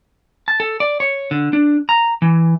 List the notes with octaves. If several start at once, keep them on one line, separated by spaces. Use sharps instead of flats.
A5
A4
D5
C#5
D3
D4
A#5
E3